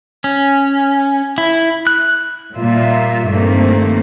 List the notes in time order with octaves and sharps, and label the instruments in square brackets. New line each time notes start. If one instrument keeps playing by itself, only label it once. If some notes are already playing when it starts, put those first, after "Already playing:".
[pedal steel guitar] C#4
E4
F#6
[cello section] A#2 G3 F4 E5
G2 D#3 A3 A#3 C4